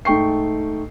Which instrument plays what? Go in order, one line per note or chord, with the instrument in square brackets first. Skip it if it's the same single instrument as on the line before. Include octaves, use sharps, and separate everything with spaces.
[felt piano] G#2 A3 G5 C#6 C7